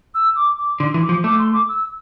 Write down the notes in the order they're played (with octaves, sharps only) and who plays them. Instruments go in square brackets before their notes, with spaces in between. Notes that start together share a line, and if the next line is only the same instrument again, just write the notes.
[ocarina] E6
D6
D6
[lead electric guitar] D3 [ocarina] C6
[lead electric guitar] E3
[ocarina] D6
[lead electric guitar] F3
[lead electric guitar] A3 [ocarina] D6
[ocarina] C6
D6
E6